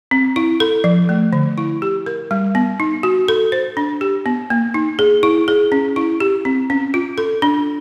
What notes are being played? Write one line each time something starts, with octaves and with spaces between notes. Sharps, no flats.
C4
E4
A4
F3
A3
D3
E4
G4
A#4
G3
B3
D#4
F#4
A4
C5
D4
G4
B3
A#3
D#4
G#4
E4
G#4
C#4
E4
G4
C4
C#4
F4
A4
D4